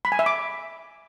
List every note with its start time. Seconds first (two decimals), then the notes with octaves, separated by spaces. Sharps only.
0.05 B5
0.12 G#5
0.19 E5
0.26 D6